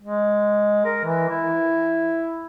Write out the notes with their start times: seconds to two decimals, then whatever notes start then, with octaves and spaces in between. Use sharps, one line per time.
0.02 G#3
0.85 A#4
1.04 E3
1.29 E4